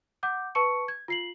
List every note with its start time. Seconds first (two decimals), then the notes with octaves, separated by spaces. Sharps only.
0.23 F#5 D6 G6
0.55 B4 A5 C#6 C#7
0.88 G#6
1.08 F4 C7 F#7